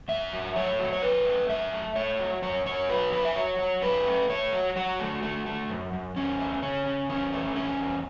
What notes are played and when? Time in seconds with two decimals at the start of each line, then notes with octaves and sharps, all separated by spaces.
0.08 F#2 E5
0.33 F#3
0.56 A3 C#5
0.79 F#3
0.93 C#5
1.02 F#2 B4
1.25 A3
1.49 F#2 E5
1.73 A3
1.96 A3 C#5
2.19 F#3
2.42 F#2 C#5
2.66 F#2 C#5
2.89 F#3 B4
3.12 F#2 B4
3.25 E5
3.35 F#3 C#5
3.59 F#3
3.82 F#2 B4
4.07 A3
4.29 A3 C#5
4.53 F#3
4.76 F#3 F#4
4.99 A3
5.23 A3
5.46 A3
5.69 F#2
5.93 F#2
6.16 E2 C#4
6.40 A3
6.62 C#3 C#4
6.86 C#3
7.09 E2 C#4
7.33 A3
7.56 E2 C#4
7.80 E2